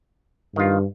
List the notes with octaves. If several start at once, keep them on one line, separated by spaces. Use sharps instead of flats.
G2 D#3 F4